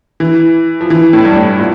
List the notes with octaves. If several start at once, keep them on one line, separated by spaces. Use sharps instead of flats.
E3
F3
E3
A2
G2
A2
A#2